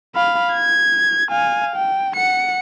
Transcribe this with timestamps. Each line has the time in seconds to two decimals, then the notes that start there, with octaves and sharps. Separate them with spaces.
0.16 F5 B5
0.54 G#6
1.30 F5 G#5
1.76 G5
2.16 F#5 C#7